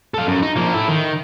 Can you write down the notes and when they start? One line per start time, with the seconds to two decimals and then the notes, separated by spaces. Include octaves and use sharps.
0.14 A4 F5
0.27 F#2
0.43 D#4
0.56 F3 A#3
0.74 E4 A4
0.88 D#3